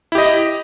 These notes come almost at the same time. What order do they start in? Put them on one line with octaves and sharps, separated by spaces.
E4 G4 D#5